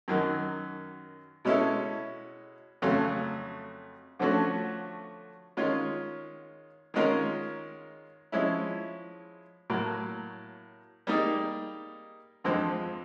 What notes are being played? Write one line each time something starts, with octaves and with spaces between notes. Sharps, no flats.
F#2 D#3 F#3
B2 G#3 C#4 E4 A4
F2 C#3 F#3 A3 C#4
D3 F3 A3 C#4 F#4
D#3 G#3 C#4 F4
D#3 G#3 C#4 F4 A#4
F3 G#3 C#4 E4
A2 F#3 A#3
G3 A#3 D#4 G#4
F2 D3 F3 G#3 C4